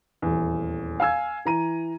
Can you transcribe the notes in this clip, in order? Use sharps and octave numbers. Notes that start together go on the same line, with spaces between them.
D#1 E2
F5 G#5 E6 G#6
E3 A#5 D#7